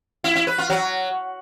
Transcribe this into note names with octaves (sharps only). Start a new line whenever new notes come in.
E4
E4
B4
F4
F#3